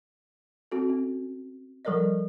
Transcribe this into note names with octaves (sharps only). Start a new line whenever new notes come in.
C4 F#4 A4
C#4
F3 G3 A4 A#4 D5 D#5